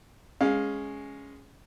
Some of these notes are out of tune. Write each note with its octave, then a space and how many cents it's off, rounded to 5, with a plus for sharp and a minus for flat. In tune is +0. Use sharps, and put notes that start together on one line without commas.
G#3 +0 C#4 +0 F5 +15